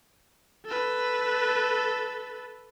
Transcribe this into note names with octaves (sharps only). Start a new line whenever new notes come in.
A4 B4